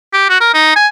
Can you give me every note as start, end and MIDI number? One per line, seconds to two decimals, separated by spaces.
0.13 0.29 67
0.29 0.37 66
0.41 0.52 70
0.54 0.72 63
0.76 0.87 80